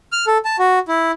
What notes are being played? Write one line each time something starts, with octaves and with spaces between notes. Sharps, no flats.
F6
A4
A5
F#4
E4